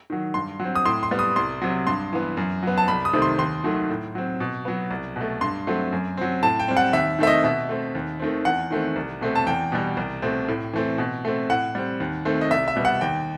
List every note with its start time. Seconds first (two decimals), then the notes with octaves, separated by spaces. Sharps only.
0.10 D#3 F#3
0.34 G2 C6
0.60 F#3 C4
0.75 D#6
0.85 A2 C6
1.03 C6
1.11 G3 B3
1.19 D#6
1.36 C2 C6
1.62 C3 F#3
1.87 G2 C6
2.13 E3 B3
2.37 F#2
2.63 F#3 B3
2.78 A5
2.88 C2 B5
3.05 D#6
3.13 C3 D#3 A3 C4
3.22 C6
3.38 D#2 C6
3.64 D#3 F#3 A3
3.89 A2
4.15 F#3 C4
4.40 B2
4.65 F#3 B3
4.91 C2
5.16 B2 A3
5.41 G2 C6
5.67 F#3 A3 C4
5.92 F#2
6.17 F#3 C4
6.43 A2 A5
6.59 G5
6.68 G3 C4
6.77 F#5
6.93 D#2 E5
7.19 D#3 A3 C4 E5
7.27 D#5
7.44 B2 E5
7.69 A3 C4
7.95 D#2
8.20 D#3 A3 C4
8.45 E2 F#5
8.71 D#3 A3 C4
8.96 C2
9.21 B2 A3 C4
9.36 A5
9.47 E2 G5
9.72 B2 G3
9.97 C2
10.22 B2 A3 C4
10.48 A2
10.73 E3 A3 C4
10.98 B2
11.25 A3 C4
11.50 A2 F#5
11.75 G3 C4
12.00 D#2
12.25 D#3 A3 C4
12.41 D#5
12.51 C2 E5
12.68 E5
12.76 B2 G3 B3
12.85 F#5
13.01 D#2 G5